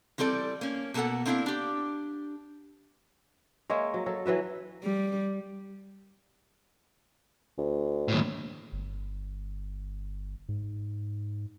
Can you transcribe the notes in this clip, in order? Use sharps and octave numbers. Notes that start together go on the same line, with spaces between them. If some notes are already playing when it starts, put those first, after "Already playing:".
E3 G3 C4 A4 D5
A#3 C#4
B2 A#3 B3 A4 F#5
A#3 C4 D4 E4 F5
D4 G4
G#3 A#3 C#5 E5
F#3
F#3 A4
E3 F#3 B4 E5
G3
D2
D#2 A2
G1
G#2